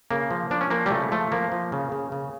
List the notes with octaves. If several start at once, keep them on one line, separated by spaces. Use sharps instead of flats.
C#3 A#3
F3
F3 D4
C#4
F3 A#3
G3
C#3 A3
F3 A3
F3 A#3
F3
C#3
C#3
C#3